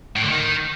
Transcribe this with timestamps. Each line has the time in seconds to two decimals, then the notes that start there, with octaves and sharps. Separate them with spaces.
0.16 A2
0.23 D3
0.29 D#3